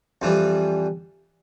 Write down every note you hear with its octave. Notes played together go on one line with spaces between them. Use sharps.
F2 E3 G3